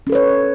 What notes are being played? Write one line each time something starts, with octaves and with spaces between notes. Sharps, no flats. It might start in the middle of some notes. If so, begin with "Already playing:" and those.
C#4 A4 B4 C#5